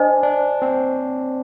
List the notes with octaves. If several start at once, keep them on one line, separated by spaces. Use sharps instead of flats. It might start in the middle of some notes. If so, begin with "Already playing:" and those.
Already playing: D4 C5 D#5 G#5
D4
C4